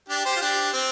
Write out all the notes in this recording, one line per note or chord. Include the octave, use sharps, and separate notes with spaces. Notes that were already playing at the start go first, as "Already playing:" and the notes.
D4 G4
G4 C5
F4
D4 G4
C4